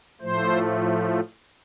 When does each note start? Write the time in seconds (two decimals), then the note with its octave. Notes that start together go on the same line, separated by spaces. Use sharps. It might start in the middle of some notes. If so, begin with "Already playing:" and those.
0.21 A2 F3 A3 C5